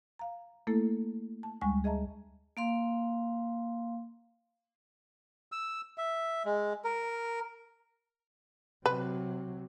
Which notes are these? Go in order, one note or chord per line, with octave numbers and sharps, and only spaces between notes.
F5 A#5
A3 A#3 E4 A4
A5
D2 G3 G#3 G#5 C#6
G#4 D#5 E5 A5 A#5
A#3 F5 C6
E6
E5
G#3
A#4
C3 F#3 B4